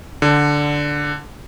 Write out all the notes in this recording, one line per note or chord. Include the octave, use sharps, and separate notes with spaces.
D3